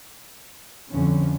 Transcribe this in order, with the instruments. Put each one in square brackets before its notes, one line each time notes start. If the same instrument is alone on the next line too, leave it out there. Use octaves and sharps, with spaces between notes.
[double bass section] F2 C#4 [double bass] D3